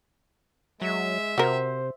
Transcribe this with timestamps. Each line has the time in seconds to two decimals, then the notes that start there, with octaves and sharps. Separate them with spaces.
0.81 F#3 G#3 E5
1.38 C3 F#4 A#4 C5